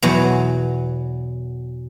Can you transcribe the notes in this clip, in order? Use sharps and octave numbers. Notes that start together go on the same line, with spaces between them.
E2 B2 F#3